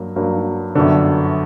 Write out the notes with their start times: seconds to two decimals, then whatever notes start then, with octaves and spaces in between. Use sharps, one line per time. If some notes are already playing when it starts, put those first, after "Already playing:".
Already playing: G2 F#3 A#3
0.16 G2 F#3 A#3
0.75 G1 F#2 D3